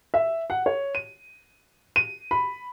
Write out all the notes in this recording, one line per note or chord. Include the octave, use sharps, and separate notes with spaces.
E5
F#5
C#5
D#7
D#7
B5